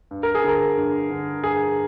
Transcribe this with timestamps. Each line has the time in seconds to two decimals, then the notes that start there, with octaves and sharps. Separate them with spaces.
0.11 G2
0.23 A#4
0.35 G#4
0.44 D3 A#4
0.78 G2
1.10 D3
1.43 G2 G#4